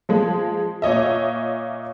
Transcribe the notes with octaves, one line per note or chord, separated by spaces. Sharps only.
F3 G#3
A#2 C#5 D#5 E5